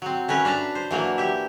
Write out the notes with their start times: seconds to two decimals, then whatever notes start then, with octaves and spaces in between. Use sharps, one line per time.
0.02 F#3 C4
0.28 A3 C#4 A#4 B4
0.45 D4 B4 A5 A#5
0.75 C5
0.91 E3 F#3 A#3 D4
1.18 G4 E5